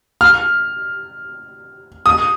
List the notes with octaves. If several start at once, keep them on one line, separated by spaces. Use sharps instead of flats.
F6
D#6